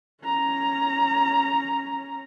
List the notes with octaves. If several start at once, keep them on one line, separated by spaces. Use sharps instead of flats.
C#4 A#5